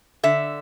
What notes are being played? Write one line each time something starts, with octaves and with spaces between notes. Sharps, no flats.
D3 E5